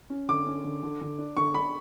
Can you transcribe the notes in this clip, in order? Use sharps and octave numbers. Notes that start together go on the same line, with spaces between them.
C#4
D3 D6
C#4
D3
D3
D3
D4
D3 C#6
D4 B5